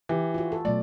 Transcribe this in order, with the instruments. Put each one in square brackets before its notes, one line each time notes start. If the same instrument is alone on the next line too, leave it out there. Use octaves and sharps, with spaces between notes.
[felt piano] E3 G4
[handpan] F4 F#4
A4
[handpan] B2 F#3 A3 [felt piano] D5